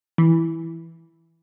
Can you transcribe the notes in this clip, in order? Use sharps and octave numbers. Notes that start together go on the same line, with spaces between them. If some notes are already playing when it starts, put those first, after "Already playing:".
E3